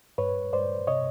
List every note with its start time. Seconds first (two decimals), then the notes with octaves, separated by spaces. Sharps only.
0.18 G2 B4 C#5
0.53 G2 C5 D5
0.87 C3 C#5 D#5